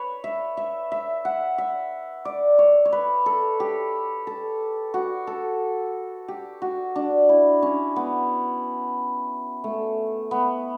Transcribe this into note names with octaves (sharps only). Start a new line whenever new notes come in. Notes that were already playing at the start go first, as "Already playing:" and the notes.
Already playing: B4 C#5
E5
E5
E5
F#5
E5
D5
C#5
C#5
B4
A4
G4
A4
F#4
A4
G4
F#4
D4
E4
C#4
B3
A3
B3